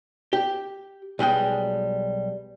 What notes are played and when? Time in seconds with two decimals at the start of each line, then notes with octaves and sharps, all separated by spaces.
0.33 G4
1.19 B1 G3 G#3 G5